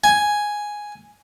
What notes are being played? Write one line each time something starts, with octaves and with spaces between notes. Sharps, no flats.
G#5